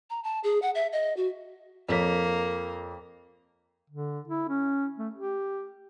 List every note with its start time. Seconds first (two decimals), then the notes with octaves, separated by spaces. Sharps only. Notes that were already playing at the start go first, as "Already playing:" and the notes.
0.10 A#5
0.24 A5
0.44 G#4
0.62 F#5
0.75 E5
0.93 D#5
1.17 F#4
1.89 F2 A#3 C#5 B6
3.90 D3
4.28 E4
4.49 C#4
4.98 A3
5.14 G4